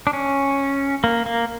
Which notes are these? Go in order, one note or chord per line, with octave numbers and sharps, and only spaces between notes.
D4
C#4
A#3
A#3